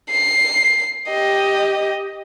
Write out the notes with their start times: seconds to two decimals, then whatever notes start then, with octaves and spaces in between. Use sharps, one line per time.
0.10 C7
1.08 G4 D#5